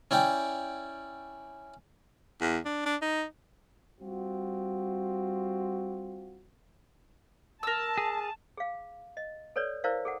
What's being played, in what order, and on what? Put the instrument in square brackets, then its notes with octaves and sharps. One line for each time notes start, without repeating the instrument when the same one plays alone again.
[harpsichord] C#4 E4 D5 G5
[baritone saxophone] E2
D4
D4
D#4
[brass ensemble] G3 C4 F4 F#4
[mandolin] A#4 E6 [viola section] A5
[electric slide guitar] G#4
[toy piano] G#4 F5
D#5
A4 B4 C#5 D5
E4 A#4 C5 D5 F5
G#4 A4 F#5